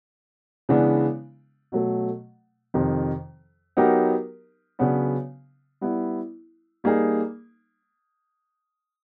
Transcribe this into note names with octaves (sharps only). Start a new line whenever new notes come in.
C#3 E3 G#3 B3 D4
B2 F#3 A3
F2 C3 D#3
F#3 B3 D#4 G4 A#4
C#3 F#3 B3 D4
G3 B3 E4
G3 A#3 D#4 G#4